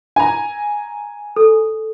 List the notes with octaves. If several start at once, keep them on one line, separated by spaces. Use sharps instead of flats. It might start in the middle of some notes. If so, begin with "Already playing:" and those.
G#5 A#5
A4